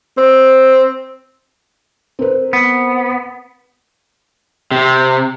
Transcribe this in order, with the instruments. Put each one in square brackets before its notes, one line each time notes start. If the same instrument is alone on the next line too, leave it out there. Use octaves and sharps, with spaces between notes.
[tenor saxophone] C4
[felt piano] C4 A#4 B4
[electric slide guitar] B3
C3